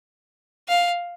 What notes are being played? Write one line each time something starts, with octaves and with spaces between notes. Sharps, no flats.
F5